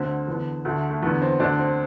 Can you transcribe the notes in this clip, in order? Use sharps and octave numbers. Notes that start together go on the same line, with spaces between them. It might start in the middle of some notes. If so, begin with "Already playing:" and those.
Already playing: D2 D3 C4
E2 D3 B3
D2 D3 A3
A3
E2 D3 B3
C4
D2 D3 D4
C4